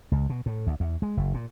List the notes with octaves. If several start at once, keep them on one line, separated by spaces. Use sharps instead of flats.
C#2
B2
A2
D2
E2
G#3
F#1
A#2